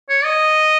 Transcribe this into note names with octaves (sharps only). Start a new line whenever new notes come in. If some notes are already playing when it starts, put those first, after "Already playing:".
C#5
D#5